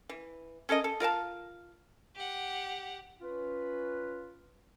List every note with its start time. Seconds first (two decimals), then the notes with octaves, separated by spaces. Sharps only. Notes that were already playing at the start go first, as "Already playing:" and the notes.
0.09 E3
0.69 C#4 A4 A#4 D#5
0.84 A4
1.00 F4 A#4 F5 A5
2.16 G4 F#5
3.21 C#4 F4 B4